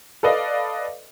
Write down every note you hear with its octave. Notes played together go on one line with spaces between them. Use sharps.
A4 B4 D5 D#5 F5